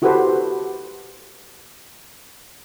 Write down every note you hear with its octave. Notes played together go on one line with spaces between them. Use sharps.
E4 F#4 G4 A4 B4 C5